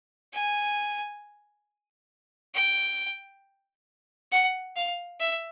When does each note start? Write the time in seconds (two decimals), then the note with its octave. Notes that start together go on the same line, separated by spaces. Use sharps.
0.33 G#5
2.54 G5
4.32 F#5
4.76 F5
5.20 E5